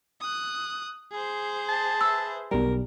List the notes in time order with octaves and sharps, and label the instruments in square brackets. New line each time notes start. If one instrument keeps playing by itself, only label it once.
[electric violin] D#6 F#6
G#4 C5
[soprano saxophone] A5
[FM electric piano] B4 E5 [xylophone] E6
[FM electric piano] B1 G3 [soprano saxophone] A#4